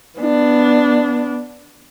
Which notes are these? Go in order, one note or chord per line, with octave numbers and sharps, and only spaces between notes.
B3 D4